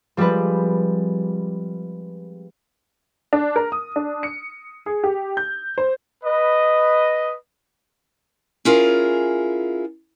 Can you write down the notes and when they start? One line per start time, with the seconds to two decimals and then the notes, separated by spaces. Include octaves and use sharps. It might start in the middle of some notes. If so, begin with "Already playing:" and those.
0.17 F3 G3 G#3 C4 B4
3.33 D4
3.56 A#4
3.72 D#6
3.96 D4
4.23 C#7
4.86 G#4
5.04 G4
5.37 G6
5.78 C5
6.24 B4 D#5
8.65 C#4 E4 F4 G#4 A#4